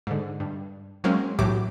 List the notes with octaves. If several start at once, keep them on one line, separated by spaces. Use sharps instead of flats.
G#2 D3
G2
F#3 G#3 A#3 C4 C#4
B1 A2 E3 F#3 G4 D6